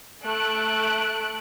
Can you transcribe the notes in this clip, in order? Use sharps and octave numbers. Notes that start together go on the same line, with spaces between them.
A3 F#6 D7